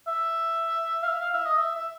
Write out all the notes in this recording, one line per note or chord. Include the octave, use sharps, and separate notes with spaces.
E5
F5
E5
F5
E5
D#5
E5
E5